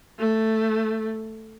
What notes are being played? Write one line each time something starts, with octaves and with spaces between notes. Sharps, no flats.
A3